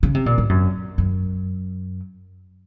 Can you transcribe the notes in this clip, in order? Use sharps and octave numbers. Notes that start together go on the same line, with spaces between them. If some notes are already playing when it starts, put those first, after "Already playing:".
C#3
C3
A#2
G#2
F#2
F#2